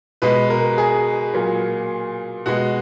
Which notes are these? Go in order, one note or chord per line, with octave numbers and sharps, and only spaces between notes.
B2 G#3 B4
A#4
G#4
A#2 F#3 A#3
B2 G#3 F#4